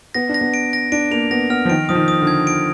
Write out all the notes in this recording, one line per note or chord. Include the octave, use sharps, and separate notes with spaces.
B3 A#6
D4
A#6
B3
D7
A#6
D4 D7
A#3 F7
B3 A#6
B3 F6
F3
D#3 D7
F3 D#6
D#3
D#6
D3
G#6
D7